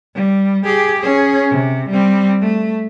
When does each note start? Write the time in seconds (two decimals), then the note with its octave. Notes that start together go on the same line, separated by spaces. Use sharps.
0.15 G3
0.64 G4 G#4
0.99 C#4 G#4
1.50 C3
1.89 G3 C4
2.41 A3